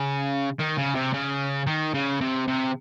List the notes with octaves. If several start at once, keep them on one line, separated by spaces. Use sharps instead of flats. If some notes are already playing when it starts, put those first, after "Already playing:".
Already playing: C#3
D#3
C#3
C3
C#3
D#3
C#3
C3
C3